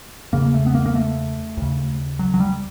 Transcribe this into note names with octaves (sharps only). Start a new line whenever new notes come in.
E2 C#3 A#3
A3
B3
A#3
A#3
A3
D#2 C#3
F#3
F#3
G3